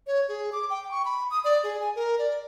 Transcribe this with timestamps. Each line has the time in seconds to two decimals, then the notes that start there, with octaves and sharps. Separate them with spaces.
0.07 C#5
0.28 G#4
0.52 D6
0.70 G5
0.91 C#6
1.05 B5
1.31 D#6
1.44 D5
1.63 G#4
1.80 G#5
1.95 A#4
2.19 D5